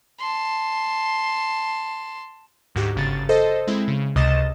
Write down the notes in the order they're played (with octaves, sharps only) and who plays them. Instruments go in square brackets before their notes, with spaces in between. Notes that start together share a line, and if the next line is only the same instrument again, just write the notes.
[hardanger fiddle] A5 C6
[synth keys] D2 G#2 F#4 G4
G1 C#3 A6
A4 C5 D#5 A5
G#3 C4 E4
C#3
C#2 C3 D#5 D#6 A6 E7